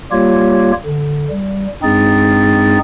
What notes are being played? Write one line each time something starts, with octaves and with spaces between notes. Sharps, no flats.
G3 A#3 F4 G4 C#5
D3
G3
G2 G#3 C4 D#4 G#4 A6